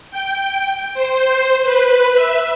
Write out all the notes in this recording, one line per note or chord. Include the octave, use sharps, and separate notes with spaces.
G5
C5
B4
E5